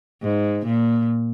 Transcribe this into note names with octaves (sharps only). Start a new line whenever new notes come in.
G#2
A#2